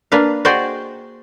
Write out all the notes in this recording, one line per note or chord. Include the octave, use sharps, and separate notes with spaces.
A#3 D4 B4 F5
F#4 G#4 C5 D5 D#5 G5